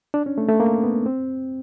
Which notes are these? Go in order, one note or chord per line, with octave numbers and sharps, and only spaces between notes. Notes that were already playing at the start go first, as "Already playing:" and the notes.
D4
C#4
A3
A3
A#3
B3
C4